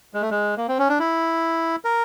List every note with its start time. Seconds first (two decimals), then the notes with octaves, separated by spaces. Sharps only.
0.14 G#3
0.22 A3
0.31 G#3
0.57 A#3
0.68 C4
0.79 C#4
0.89 D4
0.99 E4
1.85 A#4